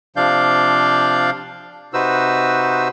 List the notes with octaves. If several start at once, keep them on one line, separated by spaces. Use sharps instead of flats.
C3 F3 D4 D5 F5 G6
C3 D#4 F#4 B4 C5 E6